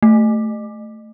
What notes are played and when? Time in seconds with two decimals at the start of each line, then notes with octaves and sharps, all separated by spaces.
0.03 A3